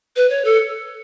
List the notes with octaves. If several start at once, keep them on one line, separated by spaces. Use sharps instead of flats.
B4
C#5
A4